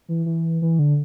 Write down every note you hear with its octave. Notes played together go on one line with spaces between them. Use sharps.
E3
E3
E3
D3